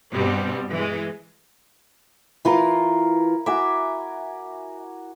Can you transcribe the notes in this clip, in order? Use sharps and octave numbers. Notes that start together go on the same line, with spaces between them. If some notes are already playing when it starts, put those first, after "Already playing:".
G2 B2 G3 C4
E3 G#3
E3 E4 F4 A#4
F#4 E5 G#5 D6